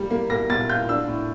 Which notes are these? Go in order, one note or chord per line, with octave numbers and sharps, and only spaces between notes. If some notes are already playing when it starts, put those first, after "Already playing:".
Already playing: G3 A#3
A#3
A#3 A#6
A#2 A6
F4 G6
D4 E6
A2